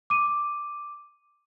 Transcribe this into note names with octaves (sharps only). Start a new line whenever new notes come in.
D6 D#7